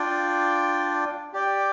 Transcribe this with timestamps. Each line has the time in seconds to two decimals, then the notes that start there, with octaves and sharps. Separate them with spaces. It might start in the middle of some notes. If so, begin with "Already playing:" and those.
Already playing: D4 F4 D5 G5
1.33 G4 D5 G5